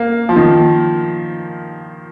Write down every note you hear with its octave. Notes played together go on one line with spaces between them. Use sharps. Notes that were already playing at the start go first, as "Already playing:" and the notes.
Already playing: A#3
F3
D#3